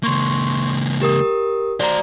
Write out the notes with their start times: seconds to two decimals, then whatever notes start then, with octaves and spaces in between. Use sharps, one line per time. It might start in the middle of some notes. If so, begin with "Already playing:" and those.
0.03 C#2 A#3 C6 C#6
1.01 G4 A#4 D#6
1.80 F#4 C5 D5 A#5